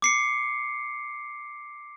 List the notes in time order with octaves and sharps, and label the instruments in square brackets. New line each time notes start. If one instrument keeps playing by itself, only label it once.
[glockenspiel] D6 C7 C#7